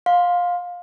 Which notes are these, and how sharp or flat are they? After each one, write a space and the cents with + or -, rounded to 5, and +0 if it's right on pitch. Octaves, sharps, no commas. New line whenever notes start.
F5 +20 C6 +0